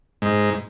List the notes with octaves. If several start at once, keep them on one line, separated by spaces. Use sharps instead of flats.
G#2